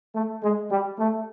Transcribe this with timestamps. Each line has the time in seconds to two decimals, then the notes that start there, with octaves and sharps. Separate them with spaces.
0.15 A3
0.43 G#3
0.70 G3
0.99 A3